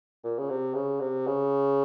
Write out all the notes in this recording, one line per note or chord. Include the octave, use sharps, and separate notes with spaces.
A#2
C#3
C3
C#3
C3
C#3